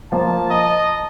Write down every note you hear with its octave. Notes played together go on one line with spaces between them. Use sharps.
F3 A#3 A5
D#5 A#5